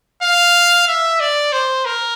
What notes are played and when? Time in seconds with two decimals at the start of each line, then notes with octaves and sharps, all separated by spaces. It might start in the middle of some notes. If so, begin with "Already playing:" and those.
0.23 F5
0.88 E5
1.20 D5
1.52 C5
1.85 A#4